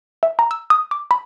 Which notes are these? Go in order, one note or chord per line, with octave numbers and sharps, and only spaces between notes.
E5
A#5
E6
D#6
D6
B5